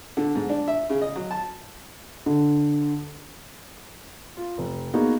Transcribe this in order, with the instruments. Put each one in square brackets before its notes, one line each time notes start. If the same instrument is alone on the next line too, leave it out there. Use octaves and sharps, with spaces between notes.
[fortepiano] D3
G#2
D4
E5
C#3
D#5
F#3
A5
[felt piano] D3
F4
F1
A#3 B3 D#4 F#4 G#4